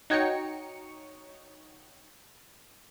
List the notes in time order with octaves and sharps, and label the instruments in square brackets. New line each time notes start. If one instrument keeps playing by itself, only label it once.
[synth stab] D#4 F#4 C#5 G5 C#7